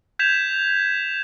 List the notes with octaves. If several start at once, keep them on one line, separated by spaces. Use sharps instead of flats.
G6 G#6 B6 E7 F7